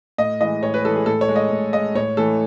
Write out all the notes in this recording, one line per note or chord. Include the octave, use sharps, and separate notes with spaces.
A2 D#5
E3 G#3 D#5
A2 C#5
B4
E3 G#3 A4
G#4
A2 A4
C#5
G#3
D#5
A2
G#3 D#5
A2 C#5
E3 A3 A4